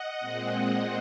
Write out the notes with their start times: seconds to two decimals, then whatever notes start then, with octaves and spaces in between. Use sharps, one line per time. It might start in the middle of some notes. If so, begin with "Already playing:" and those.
Already playing: D#5 F#5
0.20 A#2 G#3 C4